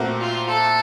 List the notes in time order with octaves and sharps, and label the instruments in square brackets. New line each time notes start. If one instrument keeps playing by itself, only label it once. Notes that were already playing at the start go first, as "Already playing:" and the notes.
Already playing: [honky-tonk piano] A#2 A3 C4 F#4 A#4
[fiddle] F4
A4